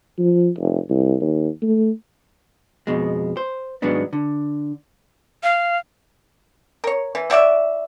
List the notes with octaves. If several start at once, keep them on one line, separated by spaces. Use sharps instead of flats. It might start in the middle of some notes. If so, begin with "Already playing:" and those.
F3
F1
C2
D#2
A3
F2 B2 G#3
C5
G#2 D#3 F#3 G#3 B3 D4
D3
F5
A#4 C#5
E3
E4 F#4 D5 E5